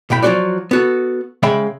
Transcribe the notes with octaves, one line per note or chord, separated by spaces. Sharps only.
B1 A2 G5 B5
F3 F#3 A3 C4 F#4 D5
B3 F#4 A4
C#3 G#3 E5 F5 G5 B5